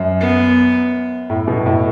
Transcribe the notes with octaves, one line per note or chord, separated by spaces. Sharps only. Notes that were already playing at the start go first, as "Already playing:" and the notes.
Already playing: F#2
B3
A2
B2
A2